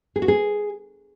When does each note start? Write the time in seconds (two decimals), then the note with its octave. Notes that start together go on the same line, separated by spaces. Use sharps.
0.16 G#4
0.22 F#4
0.28 G#4